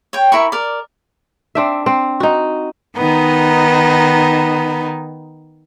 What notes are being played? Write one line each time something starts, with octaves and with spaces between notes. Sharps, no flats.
C#5 G5
E4 A#4 B5 C#6
A#4 D5
C4 D4 E5
C4
D#4 F#4
D#3 B3 D#4